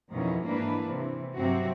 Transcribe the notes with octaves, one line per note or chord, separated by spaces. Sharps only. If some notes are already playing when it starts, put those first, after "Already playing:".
F2 B2 D#3 E3 C#4
G#2 E3 A#3 D4 B4
C3 E3
G2 C3 F#3 C4 F#4